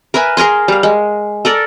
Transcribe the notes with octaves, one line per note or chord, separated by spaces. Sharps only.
A#4 B4 E5 G#5
G#4 A#4 G#5 C6
G3 F5
G#3
A4 A#4 D5